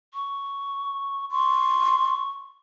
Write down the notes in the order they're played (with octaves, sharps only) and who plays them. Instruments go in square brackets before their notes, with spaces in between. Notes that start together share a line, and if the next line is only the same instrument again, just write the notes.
[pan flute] C#6
[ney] C6 [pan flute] C#6